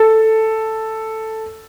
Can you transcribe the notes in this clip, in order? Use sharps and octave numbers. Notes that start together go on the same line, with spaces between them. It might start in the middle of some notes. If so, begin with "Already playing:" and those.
Already playing: A4